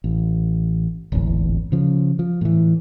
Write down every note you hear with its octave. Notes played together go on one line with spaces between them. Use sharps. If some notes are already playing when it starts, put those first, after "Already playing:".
A1
D1 G#1 E2
C#3 F3
F3
A2 E3